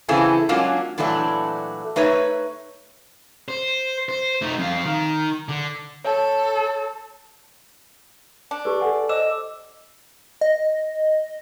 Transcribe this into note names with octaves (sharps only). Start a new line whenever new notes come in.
C#3 E3 C4 E4 G#4 A4
F#3 G#3 A#3 C#4 D4 F4
A#2 E3 F#3 A3 D4
A3 D#4 B4 C#5 E5
C5
C5
A3 D#4
F2 F5
D#3
D3
A4 C#5
D4
G4 B4
A4 F#5 G#5
C5 D#5 D6 E6 E7
D#5